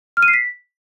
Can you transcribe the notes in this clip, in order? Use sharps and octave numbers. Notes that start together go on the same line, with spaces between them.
F6
D#7
C7
B6